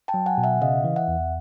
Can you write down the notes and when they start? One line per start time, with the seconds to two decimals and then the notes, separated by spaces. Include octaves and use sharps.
0.08 G5 A5
0.14 F#3
0.26 F#5 G#5
0.38 B2
0.44 E5 F#5
0.61 C#3 D#5 F5
0.84 E3
0.96 E5 F#5
1.08 E2